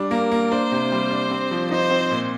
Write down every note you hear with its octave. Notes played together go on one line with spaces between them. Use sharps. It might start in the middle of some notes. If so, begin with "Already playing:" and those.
Already playing: G3 D4
A#3 A#4
A#3
D4 C5
C3
G3
D4
C4
F3
D#4 C5
C4
A#2